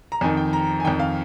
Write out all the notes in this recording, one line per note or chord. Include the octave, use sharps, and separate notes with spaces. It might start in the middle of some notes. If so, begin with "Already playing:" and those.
A#5
F2 D#3 G#5
G5
A#5
G#5
F2 D#3 G5
F5